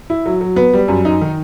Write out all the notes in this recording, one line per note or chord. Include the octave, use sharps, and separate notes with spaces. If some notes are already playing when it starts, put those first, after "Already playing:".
E4
F#3
F#3
B3
G3
F#2
D#4
D#3